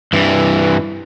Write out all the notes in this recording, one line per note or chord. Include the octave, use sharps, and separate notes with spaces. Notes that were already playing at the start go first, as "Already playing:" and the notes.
G2 E3